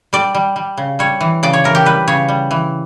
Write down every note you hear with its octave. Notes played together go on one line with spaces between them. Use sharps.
G3 D5
G3
G3
C#3
G3 C#5
E3
C#3 D5
C#5
E3 A#4
G4
G3 B4
C#3 C#5
G3
E3